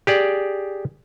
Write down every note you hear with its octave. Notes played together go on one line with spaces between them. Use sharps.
G4 G#4 D5